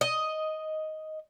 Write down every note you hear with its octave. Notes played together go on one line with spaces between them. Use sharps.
D#5